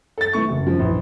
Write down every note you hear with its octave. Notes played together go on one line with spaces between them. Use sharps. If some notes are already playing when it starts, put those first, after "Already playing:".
A4 A6
E3 A3 C#6
F#1
F3
A#1 E3